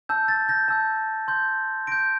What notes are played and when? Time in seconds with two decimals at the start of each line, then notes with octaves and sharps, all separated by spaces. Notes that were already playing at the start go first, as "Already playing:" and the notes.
0.09 A5 E6 G6
0.28 A6
0.49 G6 A#6
0.68 A5 E6 G6
1.28 C6 G6
1.87 C6 G6 A#6 D7